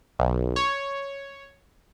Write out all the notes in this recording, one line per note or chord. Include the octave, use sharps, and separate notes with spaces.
B1
C#5